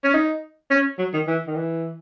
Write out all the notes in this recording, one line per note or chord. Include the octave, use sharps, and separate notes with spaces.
C#4
D#4
C#4
F#3
D#3
E3
D#3
E3